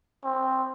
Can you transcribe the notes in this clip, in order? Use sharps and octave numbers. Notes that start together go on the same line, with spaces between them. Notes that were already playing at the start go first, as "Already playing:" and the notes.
C4